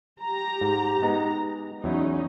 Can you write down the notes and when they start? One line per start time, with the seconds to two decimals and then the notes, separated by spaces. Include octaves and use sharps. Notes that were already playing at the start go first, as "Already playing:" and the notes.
0.21 G4 A#5
0.61 G#2
1.02 G#3 B3 D#4
1.84 E2 F#3 C#4 D#4 E4